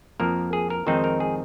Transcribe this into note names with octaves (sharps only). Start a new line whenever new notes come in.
F2 F3 A#3 A#4
G#4
A#4
F2 D#3 G#3 C4 D#4 C5
A#4
G#4